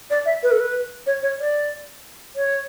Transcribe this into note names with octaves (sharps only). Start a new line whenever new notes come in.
D5
E5
B4
A4
B4
C#5
C#5
D5
C#5